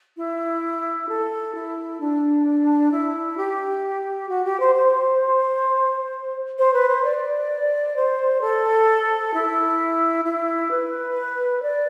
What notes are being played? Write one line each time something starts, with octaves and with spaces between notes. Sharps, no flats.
E4
A4
E4
D4
E4
G4
F#4
G4
C5
C5
C5
B4
C5
D5
C5
A4
E4
E4
B4
D5